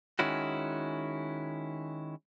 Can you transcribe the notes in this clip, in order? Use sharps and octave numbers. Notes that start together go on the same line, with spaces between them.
D#3 G#3 C#4 E4 F#4